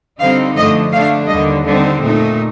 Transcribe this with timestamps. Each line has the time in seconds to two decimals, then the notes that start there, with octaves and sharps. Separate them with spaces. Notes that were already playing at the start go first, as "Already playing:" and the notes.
0.19 D3 G3 C4 D#4 F5
0.55 D3 F3 A3 D#5
0.92 D3 A3 D4 F5
1.28 D#2 D3 G3 D#5
1.65 D3 G3 C4 D#4
2.01 A#2 A3 D#4